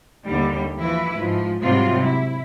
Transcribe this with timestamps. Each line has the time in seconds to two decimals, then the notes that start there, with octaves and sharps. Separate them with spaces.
0.25 D#2 D3 G3
0.76 E3 F3 E4 B4
1.16 G#2 F3
1.62 G#2 C3 F#3 G3 F4
2.03 E4